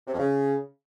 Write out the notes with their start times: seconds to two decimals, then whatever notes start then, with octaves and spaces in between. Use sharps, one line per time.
0.07 C3
0.13 F2
0.20 C#3